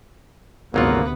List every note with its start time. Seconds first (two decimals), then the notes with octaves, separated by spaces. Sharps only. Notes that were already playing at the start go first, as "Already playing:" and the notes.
0.74 G#1 D2 C3 F#3 A#3 B3 F4